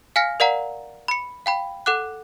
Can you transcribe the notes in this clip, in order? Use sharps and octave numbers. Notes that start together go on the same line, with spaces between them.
F5 G#5 F6 A#6 C#7
A#4 D5 F5 F#5 A#5
B5 C#7
F5 G5 B5
A4 F#5 D6 F#6